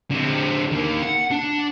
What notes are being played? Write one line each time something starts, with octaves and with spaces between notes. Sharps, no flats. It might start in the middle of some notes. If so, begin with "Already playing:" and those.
D3 C4
D#3 A#3
F#5
D4